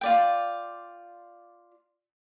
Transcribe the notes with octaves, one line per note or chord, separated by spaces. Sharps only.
F4 D5 G5